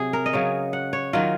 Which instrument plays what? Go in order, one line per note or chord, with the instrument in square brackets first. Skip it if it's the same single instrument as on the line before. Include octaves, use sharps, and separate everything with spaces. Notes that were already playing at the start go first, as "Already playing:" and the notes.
Already playing: [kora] C3 F#3 G#4
A#4
D#5
C#3 F#3 C#5
F#5
C#5
D#3 F#3 F4